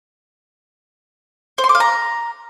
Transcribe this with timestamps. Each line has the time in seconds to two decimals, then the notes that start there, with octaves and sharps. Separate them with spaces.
1.58 C5
1.64 C6
1.69 D6
1.75 F5
1.80 A#5